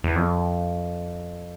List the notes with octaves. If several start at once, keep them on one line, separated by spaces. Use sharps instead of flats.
E2
F2